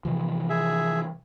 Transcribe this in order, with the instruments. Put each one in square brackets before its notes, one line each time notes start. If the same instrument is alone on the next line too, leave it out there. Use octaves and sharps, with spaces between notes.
[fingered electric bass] C3 E3 F3
[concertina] G#4 E5